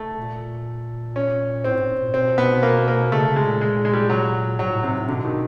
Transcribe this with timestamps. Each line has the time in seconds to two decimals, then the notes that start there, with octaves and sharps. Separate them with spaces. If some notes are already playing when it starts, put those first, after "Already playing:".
Already playing: A3
0.17 A#2
1.16 C#4
1.64 A2 C4
1.77 G#2
2.01 A#2
2.14 B2 C4
2.38 B3
2.63 A#3
2.88 A#3
3.12 C#3 A3
3.29 C#3
3.36 G#3
3.45 A#2
3.61 G#3
3.85 G#3
3.93 G3
4.10 F#3
4.59 G#2 F#3
4.71 A2
4.83 G#2 C3
4.97 A2
5.08 B2 D3
5.25 D#3